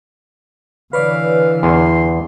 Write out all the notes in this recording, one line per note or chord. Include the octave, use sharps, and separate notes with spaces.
D3 E3 B4 C#5 D5 F5
E2 C6